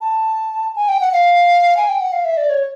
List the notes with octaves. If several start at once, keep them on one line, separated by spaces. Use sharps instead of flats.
A5
G#5
G5
F#5
F5
G#5
G5
F#5
F5
E5
D5
C#5